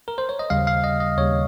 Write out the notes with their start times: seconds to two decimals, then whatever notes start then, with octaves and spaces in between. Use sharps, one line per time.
0.08 A#4
0.18 C5
0.29 C#5
0.39 D#5
0.50 D#2 C#3 G3 F5
0.67 F5
0.84 D#5
1.00 D#5
1.17 D#2 C#3 G3 C#5